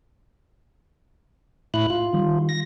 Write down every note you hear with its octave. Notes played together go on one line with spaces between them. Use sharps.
A2 E4 F#6
F4
D#3 G3
A#6